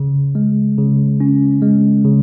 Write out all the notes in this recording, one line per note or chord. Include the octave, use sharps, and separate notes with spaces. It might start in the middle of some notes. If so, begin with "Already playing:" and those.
Already playing: C#3
G#3
C#3
C#4
G#3
C#3